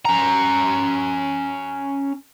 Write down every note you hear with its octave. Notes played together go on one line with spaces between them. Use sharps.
C#4 A#5